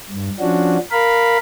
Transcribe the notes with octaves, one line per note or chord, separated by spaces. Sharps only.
G2
F3 C#4 D4 F#4
A#4 F5 B5